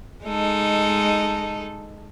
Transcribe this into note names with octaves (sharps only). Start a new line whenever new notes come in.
G#3 D#4 A4